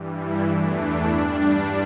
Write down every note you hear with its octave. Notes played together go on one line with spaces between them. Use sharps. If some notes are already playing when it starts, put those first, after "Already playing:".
Already playing: G2 E3 G3
E4
E2 E3 A3 D4
D4
G2 G3